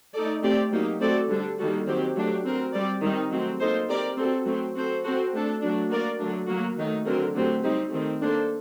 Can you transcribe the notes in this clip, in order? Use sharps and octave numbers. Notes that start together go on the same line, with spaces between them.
A3 D#4 A4 D5
A3 C4 G4 D5
F#3 A#3 D#4 G4
A3 C4 F#4 A4 D5
D3 G3 D4 A4
D#3 G3 A#3 F#4 A4
D#3 F#3 C4 G4
F#3 A3 D4 G4
C4 F#4 A#4
G3 C4 G4 D5
D#3 G3 C4 D#4
F#3 A3 C4
A#3 D#4 A4 C5
C4 G4 A#4 D5
C4 F#4 A4
F#3 A3 C4
C4 F#4 A4 C5
C4 F#4 A4 C5
A3 D4 A4
F#3 A3 D4 F#4
A#3 F#4 A#4 D5
D3 F#3 A3 D4
F#3 A#3 F#4
D#3 F#3 A3 D#4
D3 F#3 C4 F#4 A#4
D3 F#3 A3 C4 G4
G3 C4 D#4 G4
D#3 A3 C4
A#3 D4 A4 C5